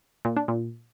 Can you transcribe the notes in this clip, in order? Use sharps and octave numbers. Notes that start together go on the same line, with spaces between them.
A#2
D4
A#2